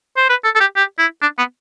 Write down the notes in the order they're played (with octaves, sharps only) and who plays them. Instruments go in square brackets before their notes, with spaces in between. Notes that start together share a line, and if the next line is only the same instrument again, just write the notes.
[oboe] C5
B4
A4
A4
G4
G4
E4
D4
B3